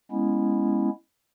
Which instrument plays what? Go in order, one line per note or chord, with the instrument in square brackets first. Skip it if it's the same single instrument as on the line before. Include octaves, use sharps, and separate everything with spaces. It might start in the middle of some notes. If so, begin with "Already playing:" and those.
[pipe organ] G#3 B3 C#4 E4